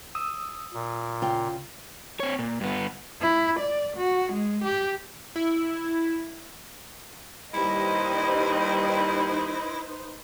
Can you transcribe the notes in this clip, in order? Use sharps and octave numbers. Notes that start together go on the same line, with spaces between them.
D#6 E6
A#2
C#3 F4 G5
C4 C#5
A#2
G2 B3
E4
D5
F#4
G#3
G4
E4
D#2 G3 D#4 E4 B4 C5 D#5